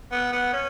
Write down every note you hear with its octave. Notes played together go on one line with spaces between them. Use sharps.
B3
B3
C#4